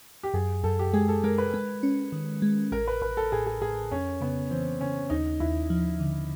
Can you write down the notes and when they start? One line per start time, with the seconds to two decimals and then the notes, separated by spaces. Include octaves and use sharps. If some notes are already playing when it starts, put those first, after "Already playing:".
0.23 G4
0.34 F#2 G#4
0.64 F#2 A4
0.79 G4
0.93 G#3 G#4
1.08 A4
1.24 G#3 A#4
1.38 B4
1.54 G#3
1.83 C#4
2.12 D#3
2.42 G#3
2.72 A1 A#4
2.88 B4
3.02 A1 B4
3.17 A4
3.32 A2 G#4
3.46 G#4
3.61 A2 G#4
3.91 F2 C#4
4.21 C#3 B3
4.51 E3 C4
4.81 C#3 C#4
5.10 D#2 D#4
5.40 D#2 E4
5.70 F3
6.00 D3